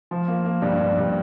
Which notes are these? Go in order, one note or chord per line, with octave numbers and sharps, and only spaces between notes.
F3
A#3
A#3
G2
G2
G2